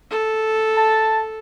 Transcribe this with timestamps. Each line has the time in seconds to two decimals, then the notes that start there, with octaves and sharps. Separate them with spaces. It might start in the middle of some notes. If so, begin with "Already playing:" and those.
0.11 A4
0.77 A5